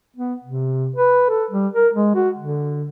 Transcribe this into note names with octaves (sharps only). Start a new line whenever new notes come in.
B3
C3
B4
A4
G3
A#4
G#3
F#4
D3